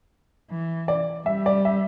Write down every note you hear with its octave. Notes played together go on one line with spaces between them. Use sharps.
E3
D5
G3 E5
D5
E5